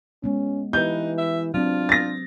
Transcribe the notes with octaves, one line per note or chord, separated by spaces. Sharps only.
G#3 B3 C#4
E3 D#4 G4 B4 G6
E5
F#3 C4 D4 F4
A6 A#6